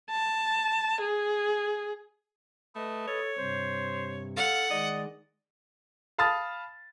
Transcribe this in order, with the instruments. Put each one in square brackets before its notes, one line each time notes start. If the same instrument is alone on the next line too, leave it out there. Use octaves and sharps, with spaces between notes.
[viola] A5
G#4
[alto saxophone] A3 [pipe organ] B4 D#5
[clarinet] A4 [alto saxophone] C#5
[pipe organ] G2 C3 [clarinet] C5
[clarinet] A4 [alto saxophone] F5 [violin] F#5
[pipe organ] D#3 G#3 [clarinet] D5 [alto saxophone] D#5
[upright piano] F5 A5 B5 D#6 F6 A6